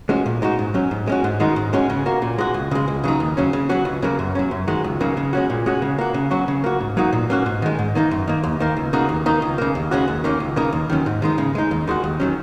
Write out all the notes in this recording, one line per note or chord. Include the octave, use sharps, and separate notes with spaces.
G#3 C#4 F#4
A#2
G#3 D#4 F#4
G#2
F#3 C#4
G#2
G#3 C#4 F#4
G#2
D#3 G#3 D#4 F#4
G#2
G#3 C#4 F#4
C#3
A#3 F#4
A#2
G#3 F#4
C#2
C#3 G#3
C#2
C#3 F#3 D#4
D#2
C#3 F#3 C#4
C#3
F#3 C#4 F#4
C#2
C#3 F#3 A#3
F#2
F#3 C#4
F#2
D#3 G#3 F#4
C#2
C#3 F#3 A#3 D#4
C#3
G#3 C#4 F#4
A#2
G#3 C#4 F#4
C#3
A#3 F#4
C#3
F#3 C#4 F#4
C#3
A#3 F#4
G#2
F#3 A#3 D#4 F#4
A#2
A#3 C#4 F#4
G#2
D#3 G#3
G#2
D#3 A#3 D#4
F#2
D#3 A#3
D#2
D#3 A#3
C#2
C#3 A#3 D#4 F#4
D#2
D#3 A#3 D#4
C#2
C#3 A#3
D#2
C#3 G#3 C#4 F#4
D#2
D#3 A#3 C#4
C#2
C#3 A#3 D#4
D#2
D#3 F#3 C#4
G#2
D#3 G#3 D#4
C#3
G#3 D#4
D#2
D#3 G#3 F#4
D#2
D#3 F#3 C#4